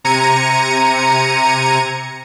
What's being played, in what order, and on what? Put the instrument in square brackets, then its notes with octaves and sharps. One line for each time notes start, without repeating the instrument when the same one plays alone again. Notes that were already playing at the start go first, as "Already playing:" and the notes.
[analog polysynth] C3 A#5 G#6 C#7 D#7